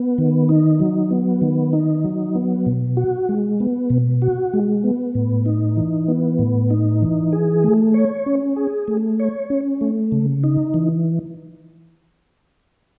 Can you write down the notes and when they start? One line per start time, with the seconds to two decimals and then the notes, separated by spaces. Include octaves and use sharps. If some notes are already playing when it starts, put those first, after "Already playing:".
Already playing: B3
0.18 D#3
0.49 D#4
0.80 F#3
1.10 B3
1.42 D#3
1.73 D#4
2.04 F#3
2.35 B3
2.66 B2
2.97 F#4
3.29 G#3
3.60 B3
3.90 B2
4.22 F#4
4.53 G#3
4.84 B3
5.15 A2
5.46 D#4
5.77 E3
6.08 B3
6.39 A2
6.70 D#4
7.02 E3
7.33 G#4
7.64 A3
7.94 C#5
8.26 C#4
8.56 G#4
8.88 A3
9.20 C#5
9.50 C#4
9.81 A3
10.12 C#3
10.44 D#4
10.74 E3